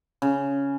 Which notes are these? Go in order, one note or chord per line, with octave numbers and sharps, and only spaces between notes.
C#3